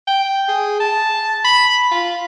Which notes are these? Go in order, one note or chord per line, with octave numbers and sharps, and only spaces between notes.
G5
G#4
A5
B5
F4